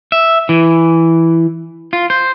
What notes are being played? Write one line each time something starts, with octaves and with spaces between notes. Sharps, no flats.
E5
E3
F4
C5